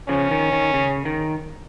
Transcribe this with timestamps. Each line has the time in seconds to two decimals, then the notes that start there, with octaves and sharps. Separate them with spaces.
0.08 C#3 F3 C#4
0.31 D#3
0.52 D#3
0.74 C#3
1.05 D#3